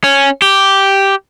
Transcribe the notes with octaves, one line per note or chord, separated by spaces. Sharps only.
C#4
G4